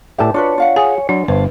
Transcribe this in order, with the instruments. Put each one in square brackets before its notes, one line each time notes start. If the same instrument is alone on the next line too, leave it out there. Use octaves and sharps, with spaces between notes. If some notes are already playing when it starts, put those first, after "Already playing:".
[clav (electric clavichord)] A2 D5 E5 [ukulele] G4 B4 A5
[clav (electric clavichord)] D4 [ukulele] F4 F#4 B4 [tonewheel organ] C#5
[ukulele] F4 F5 F#5
[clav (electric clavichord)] G#4 [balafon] G#5
[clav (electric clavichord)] F#3 [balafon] D4 [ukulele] D5
[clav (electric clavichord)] G1 [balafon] B4 [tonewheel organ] C5 A5